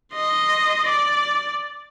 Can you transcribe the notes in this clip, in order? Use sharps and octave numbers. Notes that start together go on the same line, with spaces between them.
D#5 C6
D5